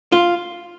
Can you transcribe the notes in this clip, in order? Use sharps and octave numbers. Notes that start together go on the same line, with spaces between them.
F4